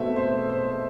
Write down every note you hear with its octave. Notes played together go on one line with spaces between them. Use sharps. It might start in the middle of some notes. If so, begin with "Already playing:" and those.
Already playing: B2 A3 C4 E5
C5
C5